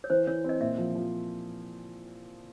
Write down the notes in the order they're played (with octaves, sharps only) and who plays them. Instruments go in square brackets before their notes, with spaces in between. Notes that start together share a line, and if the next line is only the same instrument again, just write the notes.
[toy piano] C#5
[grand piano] E3 [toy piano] C5
[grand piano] E3 [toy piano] C#5
[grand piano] C4 [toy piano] D#5
[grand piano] A#2 [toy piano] E5
[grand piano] F3
F3